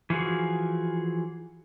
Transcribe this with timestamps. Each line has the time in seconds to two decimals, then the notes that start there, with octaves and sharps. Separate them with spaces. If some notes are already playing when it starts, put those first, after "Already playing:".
0.10 E3 F3 F#4 G#4